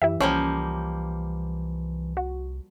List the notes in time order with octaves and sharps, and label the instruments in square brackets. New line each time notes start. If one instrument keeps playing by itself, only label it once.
[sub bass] F#2 [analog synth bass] E3 [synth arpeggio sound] E4 G4 E5
[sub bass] C2 [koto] F3 G3 A#3 [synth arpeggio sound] C#4
[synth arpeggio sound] F#4